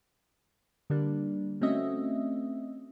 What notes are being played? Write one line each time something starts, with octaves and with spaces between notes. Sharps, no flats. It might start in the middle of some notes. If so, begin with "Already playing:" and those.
D3 G3 A#3 D4
A3 C4 C#4 F#4 D#5 E5